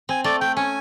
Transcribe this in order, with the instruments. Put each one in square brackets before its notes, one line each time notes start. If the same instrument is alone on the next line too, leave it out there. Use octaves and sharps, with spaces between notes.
[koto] C4 [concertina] G#5
[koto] A3 [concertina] D5
[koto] A3 [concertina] G5
[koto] C#4 [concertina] G#5